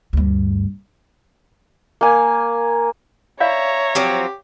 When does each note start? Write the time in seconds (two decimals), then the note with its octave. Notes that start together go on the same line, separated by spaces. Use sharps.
0.13 D2 G2
2.01 A#3 G#5
3.41 C#5 D5 E5 F5 A#5
3.95 F3 F#3 C4 G4